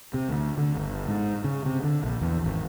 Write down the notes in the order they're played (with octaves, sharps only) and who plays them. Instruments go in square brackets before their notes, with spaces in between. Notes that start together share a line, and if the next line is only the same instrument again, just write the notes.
[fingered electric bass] C3
D2
D3
G1
G#2
C#3
C3
D3
A#1
E2
G#1